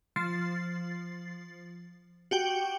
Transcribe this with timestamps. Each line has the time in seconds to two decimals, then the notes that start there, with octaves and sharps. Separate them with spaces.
0.16 F3 A6 C7
2.31 F#4 G4 G5